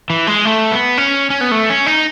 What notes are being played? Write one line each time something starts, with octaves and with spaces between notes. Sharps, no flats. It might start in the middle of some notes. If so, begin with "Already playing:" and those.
E3
G#3
A3
B3
C#4
C#4
B3
A3
C#4
D#4